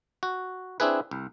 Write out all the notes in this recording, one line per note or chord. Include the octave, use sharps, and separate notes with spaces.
F#4
C4 D4 E4 G#4 B4
C2